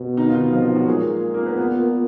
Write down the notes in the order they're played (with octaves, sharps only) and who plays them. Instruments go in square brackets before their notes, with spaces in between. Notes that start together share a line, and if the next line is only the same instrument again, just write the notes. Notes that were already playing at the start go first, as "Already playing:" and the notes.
Already playing: [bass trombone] B2
[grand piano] D#3 D#4
F4
D#3 D#4
F3 F4
F3 F4
F#3 F#4
[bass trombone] A#2 [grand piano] G#3 G#4
[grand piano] A#3 A#4
B3 B4
B3 B4